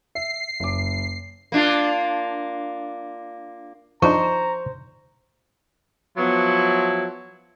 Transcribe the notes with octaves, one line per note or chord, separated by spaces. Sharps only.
E5 C7
F#1 D6
A#3 D4 F4
F3 D4 D#4 C5 A#5 C#6
F3 F#3 B3 E4